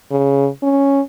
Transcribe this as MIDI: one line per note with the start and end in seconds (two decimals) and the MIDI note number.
0.11 0.48 49
0.63 1.01 61